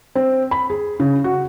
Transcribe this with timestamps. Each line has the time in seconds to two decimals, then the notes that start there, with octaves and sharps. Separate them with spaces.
0.15 C4
0.51 B5
0.70 G#4
1.00 C#3
1.24 F#4